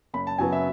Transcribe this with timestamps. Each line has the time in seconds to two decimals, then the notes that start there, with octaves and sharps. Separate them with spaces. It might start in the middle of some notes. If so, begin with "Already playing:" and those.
0.14 F#1 B5
0.27 A5
0.38 F#2 C#3 F#3 B3 G#5
0.53 E5